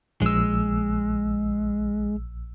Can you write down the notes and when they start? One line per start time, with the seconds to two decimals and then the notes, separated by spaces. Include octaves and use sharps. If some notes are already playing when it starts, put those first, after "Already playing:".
0.22 A#1 G#3 E6